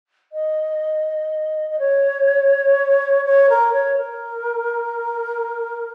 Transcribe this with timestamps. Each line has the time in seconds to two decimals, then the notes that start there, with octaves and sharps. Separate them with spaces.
0.33 D#5
1.70 D#5
1.79 C#5
3.25 C#5
3.50 A#4
3.73 C#5
3.97 A#4